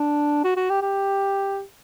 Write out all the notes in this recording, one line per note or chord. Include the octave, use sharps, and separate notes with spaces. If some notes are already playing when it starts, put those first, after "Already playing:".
Already playing: D4
F#4
F#4
G4
G4